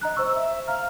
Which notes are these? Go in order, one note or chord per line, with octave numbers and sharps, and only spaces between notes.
D#5 A#5 F#6
C5 C#6 E6
E5
F5 A#5 F6